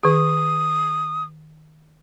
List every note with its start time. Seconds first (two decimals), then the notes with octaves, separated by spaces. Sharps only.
0.03 D#3 G#4 D#6